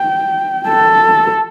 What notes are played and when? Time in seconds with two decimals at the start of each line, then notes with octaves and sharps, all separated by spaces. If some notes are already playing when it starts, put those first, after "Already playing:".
Already playing: G5
0.68 A4